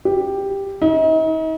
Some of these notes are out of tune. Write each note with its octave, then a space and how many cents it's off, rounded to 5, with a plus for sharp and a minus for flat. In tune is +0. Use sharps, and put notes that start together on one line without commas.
G4 +5
D#4 +40